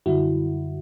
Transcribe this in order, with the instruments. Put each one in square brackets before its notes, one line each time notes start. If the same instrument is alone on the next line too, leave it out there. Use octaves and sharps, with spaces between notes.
[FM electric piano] F#2 D3 G3 E4 F#4